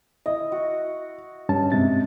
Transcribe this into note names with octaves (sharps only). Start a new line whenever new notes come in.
E4 D#5
F#4
G2 C#4 A5
G#2 C3 A6